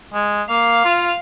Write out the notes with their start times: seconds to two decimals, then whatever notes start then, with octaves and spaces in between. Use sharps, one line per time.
0.13 G#3
0.49 A#3 F5
0.84 F4